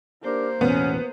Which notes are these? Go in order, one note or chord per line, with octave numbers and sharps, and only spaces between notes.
A#3 D4 G4 A#4 C5
A1 E2 B2 B3 C#4